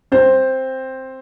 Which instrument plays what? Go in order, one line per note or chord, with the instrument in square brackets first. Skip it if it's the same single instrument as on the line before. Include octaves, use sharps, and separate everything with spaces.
[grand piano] C4 C5